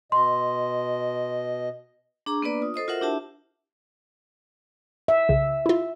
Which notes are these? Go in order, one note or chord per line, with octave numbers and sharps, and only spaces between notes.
B2 D#5 C6
D4 G#4 A#5 C#6 D6
A#3 B3 D4 B4 D5
F4 D#6
A4 C5 D#5 D#6
F4 F#4 A#4 C5 E5 F#5
D4 E4 G4 E5 A5
E5
C2 C#3
E4 F4